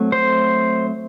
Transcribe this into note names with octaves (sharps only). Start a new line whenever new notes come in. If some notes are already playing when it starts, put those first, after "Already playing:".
Already playing: F#3 A3 C4
C5